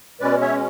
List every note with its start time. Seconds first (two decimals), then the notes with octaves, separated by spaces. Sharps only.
0.20 B2 G#3 C#4 B4 D5
0.41 C#5 E5